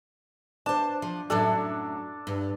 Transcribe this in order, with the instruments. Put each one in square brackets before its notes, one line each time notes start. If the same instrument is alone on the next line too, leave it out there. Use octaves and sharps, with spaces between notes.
[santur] D4 [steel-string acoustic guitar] C5 A5
[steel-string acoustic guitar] F3
[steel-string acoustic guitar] F#2 A2 F#3 [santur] D4 A4
[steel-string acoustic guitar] G2